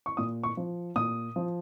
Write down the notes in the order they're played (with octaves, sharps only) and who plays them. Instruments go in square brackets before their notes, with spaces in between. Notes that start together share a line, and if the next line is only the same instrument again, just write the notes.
[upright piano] C#6
A#2 D#6
C#6
F3
A#2 D#6
F3